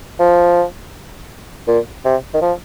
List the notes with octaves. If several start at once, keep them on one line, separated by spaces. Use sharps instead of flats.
F3
A#2
C3
D#3
F3